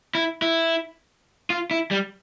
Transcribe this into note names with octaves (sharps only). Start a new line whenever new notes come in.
E4
E4
F4
E4
G3